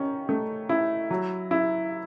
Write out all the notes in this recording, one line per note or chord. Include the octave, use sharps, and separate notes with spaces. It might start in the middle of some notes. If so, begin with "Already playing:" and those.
Already playing: D#3 C#4
A3
E4
F#3
E4